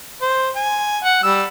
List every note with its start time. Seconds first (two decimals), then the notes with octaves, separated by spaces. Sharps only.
0.21 C5
0.56 G#5
1.04 F#5
1.23 G3 E6